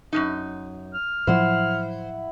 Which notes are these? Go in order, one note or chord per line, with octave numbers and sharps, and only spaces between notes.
F#2 C3 D#4
F6
A2 F3 F#3 E4 C5 F#5 E6